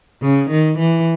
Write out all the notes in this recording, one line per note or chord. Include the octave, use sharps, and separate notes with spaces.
C#3
D#3
E3